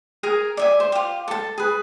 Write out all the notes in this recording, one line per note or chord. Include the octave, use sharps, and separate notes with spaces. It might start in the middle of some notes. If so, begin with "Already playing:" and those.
G#4 A#4 G#5 A#5
D5 E5 G#5
C5
F4 G4
A4 A5
G#4 B4